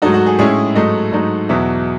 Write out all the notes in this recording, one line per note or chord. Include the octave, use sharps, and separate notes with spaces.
G#2 F#3 A3 D#4 F#4
F#4
G#4
A2 G#3 C#4 E4 G#4
G#2 F#3 A3 D#4 D#5
G#2 F#3 A3 D#4
E2 B2 F#3 E5